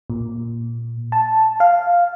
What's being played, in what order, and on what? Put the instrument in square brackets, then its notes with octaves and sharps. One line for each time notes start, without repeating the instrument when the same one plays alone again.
[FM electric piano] A#2
A5
F5